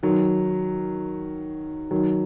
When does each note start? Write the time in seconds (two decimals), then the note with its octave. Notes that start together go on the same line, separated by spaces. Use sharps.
0.03 D#3 F#3
1.91 D#3 F#3